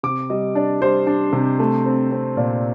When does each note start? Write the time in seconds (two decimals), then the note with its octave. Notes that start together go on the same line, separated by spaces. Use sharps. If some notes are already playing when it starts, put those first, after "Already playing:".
0.03 C3 D6
0.30 G3 D#5
0.55 D4 D5
0.81 G3 C5
1.07 D4
1.33 C3
1.59 A3
1.86 C4
2.12 C4
2.37 A#2 D5